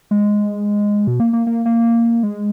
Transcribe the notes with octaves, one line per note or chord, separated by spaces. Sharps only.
G#3
B2
A#3
A#3
A#3
A#3
G#3